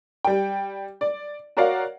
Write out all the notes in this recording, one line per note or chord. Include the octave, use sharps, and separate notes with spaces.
G3 G5
D5
F#4 A#4 C#5 D5 F5 F#5